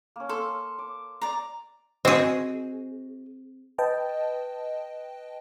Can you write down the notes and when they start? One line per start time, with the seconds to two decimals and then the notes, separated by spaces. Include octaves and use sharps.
0.16 A#3 C#4
0.29 A4 C6 E6
0.79 D6
1.22 D5 A#5
2.05 C4 F#4 G#4 C5 D#5
3.78 B4 D#5 G5 A5